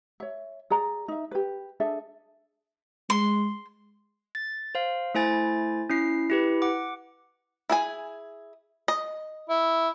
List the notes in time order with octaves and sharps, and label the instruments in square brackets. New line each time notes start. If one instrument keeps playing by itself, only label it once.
[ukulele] C#5 E5
G#4 D5 A#5
D#4 E5
G4 B4
D4 G#4 A4 E5
[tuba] G#3 [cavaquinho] C6
[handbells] A6
C5 F5
A3 E4 C5 G#5 A6
C#4 E4 C7
E4 G4 B4
F#5 D6
[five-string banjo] E4 G#4 G#5
D#5
[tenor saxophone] E4